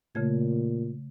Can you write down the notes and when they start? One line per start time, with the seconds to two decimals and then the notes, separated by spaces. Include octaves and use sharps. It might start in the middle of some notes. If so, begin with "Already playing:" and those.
0.15 A#2 C#3 A3 G#6